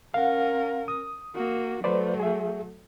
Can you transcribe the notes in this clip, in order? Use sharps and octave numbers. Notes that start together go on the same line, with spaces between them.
C#4 A#4 F5 F#5
D#6
A#3 F#4
F#3 A3 B4 C5 D5
G#4 E5